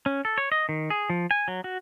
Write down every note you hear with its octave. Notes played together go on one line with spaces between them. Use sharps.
C#4
A4
C#5
D#5
D#3
G#4
F3
G#5
F#3
F#4